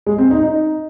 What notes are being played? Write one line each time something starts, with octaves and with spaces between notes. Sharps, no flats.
G#3
C4
D#4
D#4